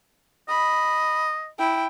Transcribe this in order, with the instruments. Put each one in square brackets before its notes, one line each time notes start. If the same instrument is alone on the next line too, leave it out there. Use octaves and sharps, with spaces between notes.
[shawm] D#5 [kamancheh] B5
[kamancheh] E4 G5